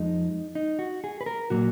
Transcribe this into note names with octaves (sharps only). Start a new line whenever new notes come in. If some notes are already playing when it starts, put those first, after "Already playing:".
Already playing: F2 F3 G#3 D#4
D#4
F#4
G#4
B4
A#4
A#2 F#3 A#3 F#4